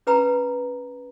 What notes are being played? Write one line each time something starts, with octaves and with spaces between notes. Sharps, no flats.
C#4 B4 G5 A#5 B5